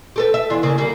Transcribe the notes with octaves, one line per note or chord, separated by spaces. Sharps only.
G4 A4 B4
E5
E2 D4 F4
C#3 A#3
D3 G3 A#3